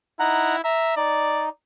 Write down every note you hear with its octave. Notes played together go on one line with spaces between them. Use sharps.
D#4 E4 F#5 A#5
E5 A#5
D#4 D5